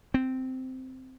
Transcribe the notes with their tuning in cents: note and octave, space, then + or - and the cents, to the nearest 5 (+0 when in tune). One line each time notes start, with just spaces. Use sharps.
C4 -10